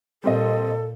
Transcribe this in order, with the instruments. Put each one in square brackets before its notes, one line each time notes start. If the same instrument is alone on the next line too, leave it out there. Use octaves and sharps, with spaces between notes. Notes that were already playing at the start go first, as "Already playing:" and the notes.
[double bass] A#2 [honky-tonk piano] G3 C4 D#5 [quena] A4